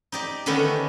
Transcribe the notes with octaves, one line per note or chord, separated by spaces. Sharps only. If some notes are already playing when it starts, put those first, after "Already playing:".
D#4 G4 D5
D3 D#3 A3 B3 C#4 D4